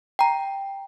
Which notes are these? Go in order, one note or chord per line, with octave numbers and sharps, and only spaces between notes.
G5 A#5